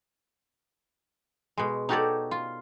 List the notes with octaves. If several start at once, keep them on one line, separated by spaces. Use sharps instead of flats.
B2 G#3
D#4 F#4 G4 A4 C#5 D5
F4